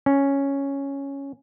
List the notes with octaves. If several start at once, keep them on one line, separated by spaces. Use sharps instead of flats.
C#4